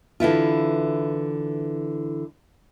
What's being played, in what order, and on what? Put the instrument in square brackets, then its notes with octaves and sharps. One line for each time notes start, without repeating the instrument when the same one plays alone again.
[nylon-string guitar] D3 E3 E4 F4